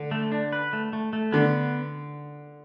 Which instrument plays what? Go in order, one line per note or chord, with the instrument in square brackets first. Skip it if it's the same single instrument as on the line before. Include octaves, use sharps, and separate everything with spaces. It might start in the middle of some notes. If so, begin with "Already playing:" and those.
Already playing: [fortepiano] D3
[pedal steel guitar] A3
D4
B4
A3
A3
A3
[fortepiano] D3 [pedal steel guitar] B3